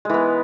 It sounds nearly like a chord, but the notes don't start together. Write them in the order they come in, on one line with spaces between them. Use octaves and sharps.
G#3 E3 B3